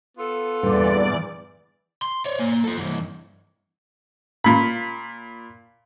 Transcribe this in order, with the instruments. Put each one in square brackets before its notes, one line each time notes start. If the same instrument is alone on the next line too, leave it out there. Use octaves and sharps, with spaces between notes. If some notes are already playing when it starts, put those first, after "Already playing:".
[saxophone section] B3 F4 A4
[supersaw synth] E2 D5 [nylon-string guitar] G2 A#2 D3 [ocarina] B4
[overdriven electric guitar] C6
C#5 D5
A#3 G#5
F4 A4
G2 E3
[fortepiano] A#2 B5